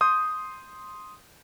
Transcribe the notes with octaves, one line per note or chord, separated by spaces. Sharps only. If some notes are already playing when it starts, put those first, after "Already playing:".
C6 D#6 G6